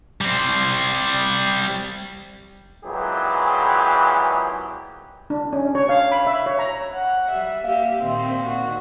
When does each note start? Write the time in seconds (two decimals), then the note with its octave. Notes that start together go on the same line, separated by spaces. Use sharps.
0.21 G3 C4
2.85 G#1 A#2 E3 F#3 G4 G#4
5.30 D4
5.53 C#4
5.75 C#5
5.89 F5
6.12 B5
6.27 E5
6.46 C#5
6.59 A#5
6.93 F#5
7.31 G3 E5
7.64 A#3 G4 F5
8.01 A#2 D#3 C4
8.45 F#4